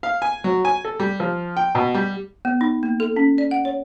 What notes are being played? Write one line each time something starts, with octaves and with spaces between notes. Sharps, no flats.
F5
G#5
F#3
G#5
A4
G3
F3
G5
B2
G3
B3
D#4
A#3
A4
C#4
D5
F#5
C#5